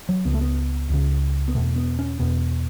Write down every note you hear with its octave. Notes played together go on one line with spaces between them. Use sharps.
F#3
C#2 C#3 B3
A3
B3
C#2 C#3
B3
E2 B2 A3
B3
C#4
E2 B2 B3